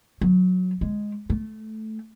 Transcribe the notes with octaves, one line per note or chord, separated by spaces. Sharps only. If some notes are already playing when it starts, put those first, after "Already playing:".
F#3
G#3
A3